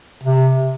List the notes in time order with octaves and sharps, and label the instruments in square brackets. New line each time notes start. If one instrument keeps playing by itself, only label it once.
[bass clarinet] C3